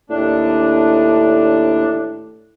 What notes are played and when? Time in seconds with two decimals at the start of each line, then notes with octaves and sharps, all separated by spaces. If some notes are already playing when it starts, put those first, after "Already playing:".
0.10 D#2 A2 D4